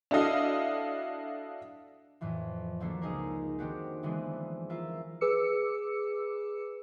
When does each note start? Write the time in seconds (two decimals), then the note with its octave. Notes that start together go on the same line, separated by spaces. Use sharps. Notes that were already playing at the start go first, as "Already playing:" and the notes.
0.11 D4 E4 F#4 A4 D#5 F5
2.21 F2 A2 E3 F3
2.80 D3 F3 F#3 A3 A#3 D4
3.01 C#2 D#4 G#4 A#4
3.59 D#3 C4 D4 F#4 G4
4.03 D3 E3 F3 G#3 B3 C4
4.69 E4 F4 A#4 E5
5.21 G#4 B4 D6 E6 C#7